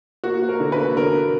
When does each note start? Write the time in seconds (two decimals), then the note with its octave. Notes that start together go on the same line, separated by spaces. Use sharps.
0.24 A#3 F#4
0.42 A#3
0.49 A#4
0.60 D3
0.72 B4
0.78 A#3
0.97 D3 A#4